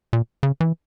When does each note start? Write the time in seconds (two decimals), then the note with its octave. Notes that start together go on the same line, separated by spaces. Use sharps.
0.13 A#2
0.43 C#3
0.60 E3